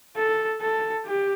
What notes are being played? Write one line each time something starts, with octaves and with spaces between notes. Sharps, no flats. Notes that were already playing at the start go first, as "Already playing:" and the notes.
A4
A4
G4